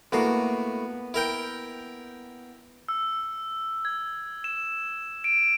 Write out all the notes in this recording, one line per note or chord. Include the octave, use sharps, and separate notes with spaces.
A2 A#3 B3 F#4
E4 A#4 G5
E6
G#6
E7
D7